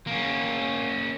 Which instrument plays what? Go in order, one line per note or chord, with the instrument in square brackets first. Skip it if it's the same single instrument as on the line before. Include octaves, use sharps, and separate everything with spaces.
[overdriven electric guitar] A#3 C#4